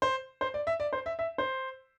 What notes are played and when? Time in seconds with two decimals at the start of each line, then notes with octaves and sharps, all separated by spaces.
0.02 C5
0.41 C5
0.54 D5
0.67 E5
0.80 D5
0.93 C5
1.06 E5
1.19 E5
1.38 C5